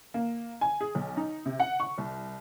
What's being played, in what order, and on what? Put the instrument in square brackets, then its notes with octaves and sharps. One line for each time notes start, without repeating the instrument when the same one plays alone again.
[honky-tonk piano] A#3
G#5
G#4
B1
D#4
C3
F#5
C#6
C2